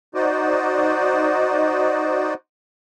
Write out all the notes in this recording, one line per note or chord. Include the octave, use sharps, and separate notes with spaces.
D#4 F#4 C5 D5 D#5